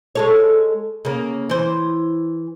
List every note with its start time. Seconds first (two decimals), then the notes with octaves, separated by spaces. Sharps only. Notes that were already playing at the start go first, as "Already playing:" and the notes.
0.15 G#3 A4 C#5
1.05 C#3 A#3
1.50 E3 C5